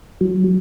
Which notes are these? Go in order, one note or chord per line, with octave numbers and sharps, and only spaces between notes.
F#3